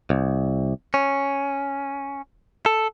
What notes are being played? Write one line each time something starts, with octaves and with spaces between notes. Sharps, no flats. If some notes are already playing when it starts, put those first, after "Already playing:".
C2
C#4
A4